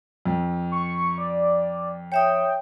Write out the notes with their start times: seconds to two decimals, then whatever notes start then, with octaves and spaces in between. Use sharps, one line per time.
0.26 F2
0.72 C#6
1.18 D5
2.12 C#5 E5 G5 D#6